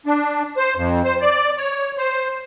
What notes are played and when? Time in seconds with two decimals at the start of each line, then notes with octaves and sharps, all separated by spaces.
0.06 D4
0.57 C5
0.76 F2
1.04 C5
1.21 D5
1.57 C#5
1.97 C5